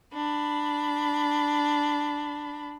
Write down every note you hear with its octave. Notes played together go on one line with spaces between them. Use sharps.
D4 B5